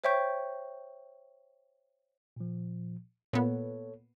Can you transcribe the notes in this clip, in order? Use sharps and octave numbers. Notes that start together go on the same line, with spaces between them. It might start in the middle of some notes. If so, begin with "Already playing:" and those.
C5 C#5 E5 G5 C#6 G6
A#2 F3
A#2 B3 A4 C#5